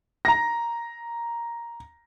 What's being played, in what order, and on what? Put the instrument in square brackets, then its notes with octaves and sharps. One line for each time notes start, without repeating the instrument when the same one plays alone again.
[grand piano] A#5 A#6